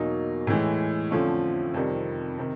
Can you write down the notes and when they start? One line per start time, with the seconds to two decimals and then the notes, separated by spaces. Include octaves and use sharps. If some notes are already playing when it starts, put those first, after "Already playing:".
Already playing: E2 B2 F#3 A#3 D#4
0.47 A2 E3 G#3
1.11 F2 D3 F3 A3 C#4
1.74 F2 C3 D#3 G3
2.38 C3 D#3